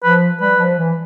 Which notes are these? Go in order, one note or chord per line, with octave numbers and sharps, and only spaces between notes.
F3 B4
G3 B4
F3
E3